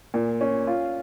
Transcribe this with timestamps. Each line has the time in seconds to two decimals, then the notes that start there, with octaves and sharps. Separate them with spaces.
0.14 A#2
0.41 C#4
0.67 F4